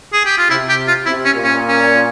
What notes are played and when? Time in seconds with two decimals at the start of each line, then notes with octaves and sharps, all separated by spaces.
0.13 G#4
0.26 G4
0.38 F4
0.50 C3 E4
0.69 G4
0.87 F4
1.06 C3 E4
1.25 C#4
1.34 A#2
1.43 C#4
1.68 C#4